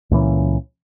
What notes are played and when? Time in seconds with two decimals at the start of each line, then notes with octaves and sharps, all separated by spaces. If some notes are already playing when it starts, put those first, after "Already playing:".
0.11 C#2 A#2 E3 C#4